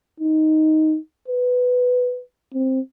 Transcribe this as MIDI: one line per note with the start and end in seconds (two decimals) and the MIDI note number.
0.20 0.97 63
1.28 2.21 71
2.54 2.80 60